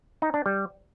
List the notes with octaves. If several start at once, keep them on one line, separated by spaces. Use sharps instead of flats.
D#4
D4
G3